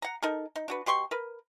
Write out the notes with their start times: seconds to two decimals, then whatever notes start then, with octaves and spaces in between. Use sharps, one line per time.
0.02 F#5 A#5
0.23 D#4 A4 A#4
0.56 D#4
0.68 D4 F#4 B4
0.86 B2 G4 C6 C#6
1.11 A#4 B4